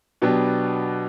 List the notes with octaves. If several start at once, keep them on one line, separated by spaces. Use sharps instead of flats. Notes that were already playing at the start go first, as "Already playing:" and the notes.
B2 F#3 B3 D4 G4